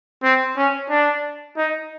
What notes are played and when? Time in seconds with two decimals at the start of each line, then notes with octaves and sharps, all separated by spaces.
0.23 C4
0.57 C#4
0.90 D4
1.57 D#4